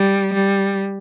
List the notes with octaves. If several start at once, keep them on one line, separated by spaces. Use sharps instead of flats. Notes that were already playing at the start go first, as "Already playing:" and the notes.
Already playing: G3
G3